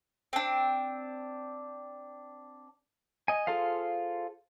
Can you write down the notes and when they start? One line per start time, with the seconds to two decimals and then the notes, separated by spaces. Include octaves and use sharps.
0.33 C4 D4
3.28 D#5 G#5
3.47 F4 G#4 A4 C5 F5